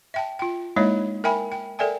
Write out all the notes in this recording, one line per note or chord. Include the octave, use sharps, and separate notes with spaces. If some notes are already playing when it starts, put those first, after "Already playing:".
E5 G5 A5
F4 G5
G#3 A#3 D#4 E4 C#5 D#5
A#4 E5 G5 G#5 B5
G5
A4 A#4 D5 E5 G5 G#5